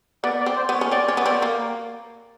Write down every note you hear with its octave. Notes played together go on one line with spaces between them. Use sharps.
B3 D5
D5
C4
C5
B3
C#5
C#4
C4 D5
C#4
B3
C#5
C4 D5
A#3